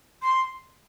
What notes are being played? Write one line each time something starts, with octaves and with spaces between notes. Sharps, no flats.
C6